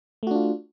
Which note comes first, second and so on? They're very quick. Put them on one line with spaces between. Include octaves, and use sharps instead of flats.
A3 F#4 D4 F4